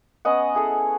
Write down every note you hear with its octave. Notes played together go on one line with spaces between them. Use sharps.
B3 C#4 D#5 F#5
E4 G#4 A4